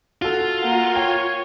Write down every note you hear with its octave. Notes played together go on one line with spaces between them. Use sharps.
F4 F#4 A4
A#3 F#5
C#5 G5